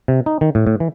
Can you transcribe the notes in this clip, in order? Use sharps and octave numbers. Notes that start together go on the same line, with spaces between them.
C3
D#4
D#3
A2
A2
E3